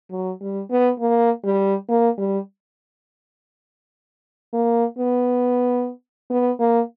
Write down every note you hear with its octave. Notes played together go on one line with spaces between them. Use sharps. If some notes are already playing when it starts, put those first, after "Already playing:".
F#3
G3
B3
A#3
G3
A#3
G3
A#3
B3
B3
A#3